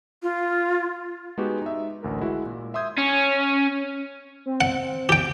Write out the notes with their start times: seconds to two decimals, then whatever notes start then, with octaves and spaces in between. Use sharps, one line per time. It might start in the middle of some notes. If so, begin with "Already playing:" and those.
0.23 F4
1.38 G#3 B3 D#4 F#4 G4 B4
1.62 D#4 E5
2.03 A1 D2 A#4
2.21 G#3 E4 F#4
2.46 A#2
2.74 E5 C6 D#6 G6 G#6
2.98 C#4
4.46 C4
4.61 F#5
5.09 G4 G5